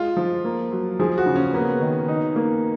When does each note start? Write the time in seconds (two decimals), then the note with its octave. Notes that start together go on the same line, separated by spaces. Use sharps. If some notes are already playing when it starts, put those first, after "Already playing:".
Already playing: G#3 F4
0.17 F3
0.45 A#3
0.72 F#3
1.00 F3 G#4
1.18 F#4
1.26 C#3
1.36 C#4
1.53 A#3 B3
1.81 D#3
2.08 D#4
2.36 A#3